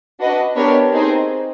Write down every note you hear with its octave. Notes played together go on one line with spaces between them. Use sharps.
D4 F#4 B4 D#5
B3 D4 G4 A#4 C#5
C4 D#4 G#4 C5